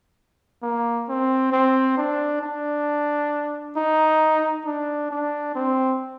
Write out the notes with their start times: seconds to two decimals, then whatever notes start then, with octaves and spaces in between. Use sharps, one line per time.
0.63 A#3
1.09 C4
1.52 C4
1.97 D4
2.42 D4
3.77 D#4
4.66 D4
5.11 D4
5.55 C4